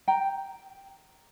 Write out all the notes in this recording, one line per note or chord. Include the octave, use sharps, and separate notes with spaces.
G5 A#5